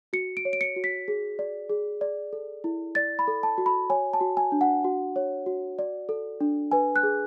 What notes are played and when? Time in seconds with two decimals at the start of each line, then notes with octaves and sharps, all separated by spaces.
0.13 F#4 C#7
0.37 D7
0.45 C#5
0.53 D7
0.61 C#7
0.76 F#4
0.84 B6
1.08 G#4
1.39 D5
1.70 G#4
2.01 D5
2.33 A4
2.64 E4
2.95 D5 A6
3.19 B5
3.28 A4
3.43 A5
3.58 F#4
3.66 B5
3.90 C#5 G#5
4.13 A5
4.21 F#4
4.37 G#5
4.52 D4
4.61 F#5
4.84 F#4
5.16 C#5
5.46 F#4
5.79 D5
6.09 A4
6.40 D4
6.71 B4 G#5
6.96 F#6
7.03 G#4